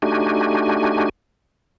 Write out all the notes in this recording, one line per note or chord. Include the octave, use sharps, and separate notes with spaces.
A3 D4 D#4 F#4 G4 G#5